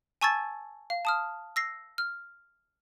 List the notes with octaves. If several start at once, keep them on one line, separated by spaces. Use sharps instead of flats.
G#5 A5 C#6 E6 G#6 A6
F5
A5 D#6 F6
E6 A#6 C7
F6